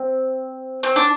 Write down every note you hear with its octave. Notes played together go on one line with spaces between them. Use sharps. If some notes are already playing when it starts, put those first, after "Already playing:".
Already playing: C4
C4
D4